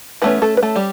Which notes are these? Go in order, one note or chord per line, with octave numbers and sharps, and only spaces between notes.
E3 A3 B3 C#4 B4
A3 A4
B4
A3 A4
G3 G4